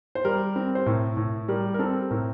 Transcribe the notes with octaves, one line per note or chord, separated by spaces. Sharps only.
C5
G3 A#4
C4
C5
A2 A#4
A2
G3 A#4
A#4
C4 A4
A2 A#4